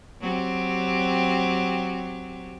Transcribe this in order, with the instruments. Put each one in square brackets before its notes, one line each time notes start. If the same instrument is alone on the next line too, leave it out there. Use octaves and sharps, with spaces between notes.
[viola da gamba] F#3 C4 G4